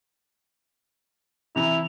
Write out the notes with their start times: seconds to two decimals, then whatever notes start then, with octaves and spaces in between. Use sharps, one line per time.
1.56 C3 E3 E4 A#5 F7